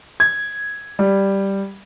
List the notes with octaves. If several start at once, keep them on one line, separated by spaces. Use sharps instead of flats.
G#6
G3